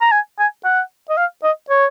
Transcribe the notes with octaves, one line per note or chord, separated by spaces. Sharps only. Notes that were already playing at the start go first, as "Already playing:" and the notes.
A#5
G#5
G#5
F#5
D#5
F5
D#5
C#5